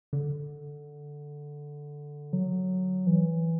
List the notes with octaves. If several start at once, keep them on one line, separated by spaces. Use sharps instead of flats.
D3
F#3
E3